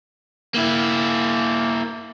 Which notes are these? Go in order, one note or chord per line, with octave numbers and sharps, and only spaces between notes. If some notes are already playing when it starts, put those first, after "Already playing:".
A#3 E4